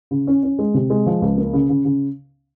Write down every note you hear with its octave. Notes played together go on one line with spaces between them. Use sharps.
C#3
C#4
C#4
G#3
C3
G#3
F3
C#2
A#3
C#3
C#3
C#3